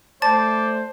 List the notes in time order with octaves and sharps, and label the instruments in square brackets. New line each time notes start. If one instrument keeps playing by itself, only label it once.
[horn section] A3 C5 [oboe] D5 [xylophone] A5 A6